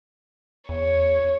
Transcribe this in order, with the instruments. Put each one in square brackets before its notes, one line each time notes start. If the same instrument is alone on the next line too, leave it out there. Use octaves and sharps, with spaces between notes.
[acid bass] E2 [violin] C#5